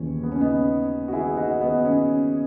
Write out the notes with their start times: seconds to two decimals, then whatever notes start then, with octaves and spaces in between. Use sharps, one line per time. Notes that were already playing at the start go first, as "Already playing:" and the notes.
Already playing: D#2 C#3 E3 C#4
0.23 B3
0.32 C#4
0.41 B3 D#4
1.08 F#4
1.13 E4 G#4
1.37 D#4 F#4
1.61 B3 D#4
1.85 C#4